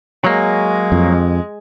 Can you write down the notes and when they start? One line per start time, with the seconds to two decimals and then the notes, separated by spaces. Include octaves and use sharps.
0.24 F#3 G#3 A#3
0.92 F2